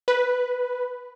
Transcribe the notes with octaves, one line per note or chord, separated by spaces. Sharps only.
B4